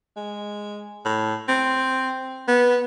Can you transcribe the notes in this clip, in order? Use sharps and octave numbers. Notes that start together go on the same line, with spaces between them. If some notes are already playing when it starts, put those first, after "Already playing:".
G#3
A2
C4
B3